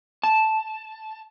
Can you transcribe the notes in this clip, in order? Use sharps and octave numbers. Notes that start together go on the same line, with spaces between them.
A5